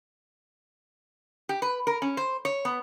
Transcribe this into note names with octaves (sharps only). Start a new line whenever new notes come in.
G4
B4
A#4
C#4
C5
C#5
B3